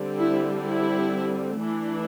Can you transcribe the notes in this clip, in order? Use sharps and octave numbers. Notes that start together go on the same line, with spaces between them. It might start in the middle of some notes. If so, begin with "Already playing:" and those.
Already playing: D3 G3 C4
E4
E4
E3 A3 D4